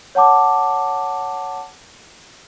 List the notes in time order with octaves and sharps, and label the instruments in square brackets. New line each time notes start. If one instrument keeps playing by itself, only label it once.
[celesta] C#5 F#5 A5 D6